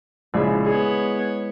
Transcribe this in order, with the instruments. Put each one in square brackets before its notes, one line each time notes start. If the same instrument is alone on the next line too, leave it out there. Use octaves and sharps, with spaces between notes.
[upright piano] A#1 C#3 [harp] G#3 E4
[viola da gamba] B3 C#5 [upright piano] G#4